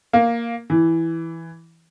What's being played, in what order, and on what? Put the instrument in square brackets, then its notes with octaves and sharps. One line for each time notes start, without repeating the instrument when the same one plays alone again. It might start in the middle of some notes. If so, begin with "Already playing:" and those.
[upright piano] A#3
E3